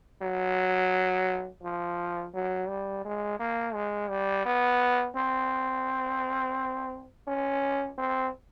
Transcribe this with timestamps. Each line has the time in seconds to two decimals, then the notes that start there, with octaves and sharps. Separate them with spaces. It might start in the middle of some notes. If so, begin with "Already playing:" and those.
0.22 F#3
1.63 F3
2.34 F#3
2.68 G3
3.04 G#3
3.39 A#3
3.74 G#3
4.09 G3
4.45 B3
5.16 C4
7.27 C#4
7.98 C4